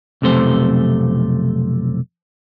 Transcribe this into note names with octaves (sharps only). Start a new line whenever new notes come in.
B1 F2 C3 A3 C5